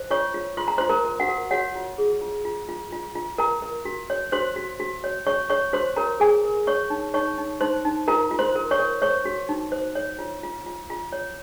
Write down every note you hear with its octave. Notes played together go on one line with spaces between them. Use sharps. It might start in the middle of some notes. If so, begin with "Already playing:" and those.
Already playing: C5
F4 C#5 C#6
F4
F4 C6
A#5
F4 C5 C6
A#4 A#5
A#4
F#4 F#5
A#4
F#4 C#5 F#5
F4
G#4
F4
F4
F4
F4
F4
A#4 A#5
A#4
F#4
C#5
F#4 C5 C6
F#4
F#4
C#5
C#5 C#6
C#5 C#6
F#4 C5 C6
A#4 C#5 A#5
G#4 A#4 G#5
A#4
C#5 C#6
D#4
D#4 C#5 C#6
D#4
D#4 C5 C6
D#4
F4 A#4 A#5
F4
C5 C6
A#4
C#5 C#6
A#4
C5 C#5 C#6
F#4
D#4
C5
C#5
F4
F4
F4
F4
C#5